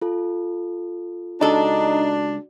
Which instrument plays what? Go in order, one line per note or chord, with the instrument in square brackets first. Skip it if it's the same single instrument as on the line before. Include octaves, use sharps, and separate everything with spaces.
[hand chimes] F4 A4
[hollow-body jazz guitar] C#2 A4 [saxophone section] D4 [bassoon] D#4 [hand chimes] F#4 D5